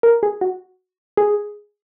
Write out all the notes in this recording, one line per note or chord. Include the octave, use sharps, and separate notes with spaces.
A#4
G#4
F#4
G#4